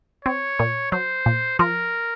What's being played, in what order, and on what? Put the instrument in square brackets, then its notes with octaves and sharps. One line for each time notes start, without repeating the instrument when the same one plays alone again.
[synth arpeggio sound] C4 [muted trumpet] C#5
[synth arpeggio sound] A#2
[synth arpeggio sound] F#3 [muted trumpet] C5
[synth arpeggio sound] A#2
[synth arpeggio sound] F3 [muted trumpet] A#4